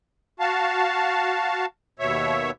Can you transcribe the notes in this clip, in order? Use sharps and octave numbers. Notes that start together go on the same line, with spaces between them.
F#4 F5 A5
D#2 B2 C#5 E5